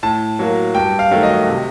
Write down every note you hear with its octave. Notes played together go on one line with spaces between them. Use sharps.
A2 A5
F#3 A#3
G2 G5
F5
D#3 F#3 A3
D#5
C3